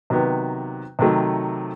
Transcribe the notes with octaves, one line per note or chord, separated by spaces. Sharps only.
C3 D#3 F#3 B3
C3 D#3 F#3 A3